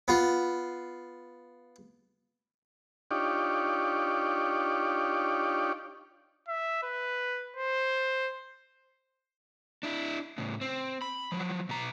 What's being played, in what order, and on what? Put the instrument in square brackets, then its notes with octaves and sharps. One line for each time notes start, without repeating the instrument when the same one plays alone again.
[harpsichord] B3 F4
[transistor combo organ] D4 D#4 F4 G4 C#5 D5
[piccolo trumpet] E5
B4
C5
[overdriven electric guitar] D4 E4
A2 C#3
C4
B5
F3 F#3
B2 A#5